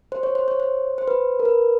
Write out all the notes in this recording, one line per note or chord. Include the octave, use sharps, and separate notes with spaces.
C5
C#5
C5
C#5
C5
C5
B4
A#4
B4